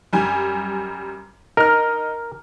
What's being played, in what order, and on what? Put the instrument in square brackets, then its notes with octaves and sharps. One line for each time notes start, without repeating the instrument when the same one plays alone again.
[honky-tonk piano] F#2 G3 G#5
[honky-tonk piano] D#4 F6 [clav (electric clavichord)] A#4